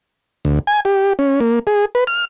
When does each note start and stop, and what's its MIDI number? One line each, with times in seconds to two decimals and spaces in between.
0.45 0.59 38
0.67 0.80 80
0.85 1.13 67
1.19 1.40 61
1.40 1.59 58
1.67 1.85 68
1.95 2.04 71
2.07 2.25 89